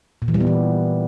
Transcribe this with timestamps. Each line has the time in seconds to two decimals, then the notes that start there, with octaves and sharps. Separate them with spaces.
0.22 A#2
0.28 E3
0.34 G3
0.41 B3
0.47 E3